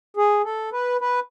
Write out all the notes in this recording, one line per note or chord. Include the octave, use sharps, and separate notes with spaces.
G#4
A4
B4
B4